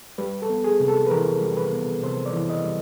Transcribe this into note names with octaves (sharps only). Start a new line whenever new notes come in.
G3 B4
A4
B3
G#4
C3
A4
B4
E3 A#4
G3
B4
B3
C3 C5
D5
E3
D#5
G3